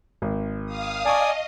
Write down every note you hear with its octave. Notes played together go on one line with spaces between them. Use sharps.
G#1
F5 D#6
D5 D#5 G#5 A5 C#6 D#6